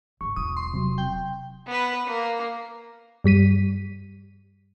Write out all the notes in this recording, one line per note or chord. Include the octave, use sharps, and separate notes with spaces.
C#2 G#2 C#6
E1 F4 D#6
C6
C3 F#3
G5
B3 B4
A#3
G2 G3 B6 D#7